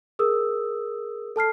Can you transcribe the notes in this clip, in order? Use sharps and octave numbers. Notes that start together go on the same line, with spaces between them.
G#4 A#4 D#6 E6
A4 A5 F6 C7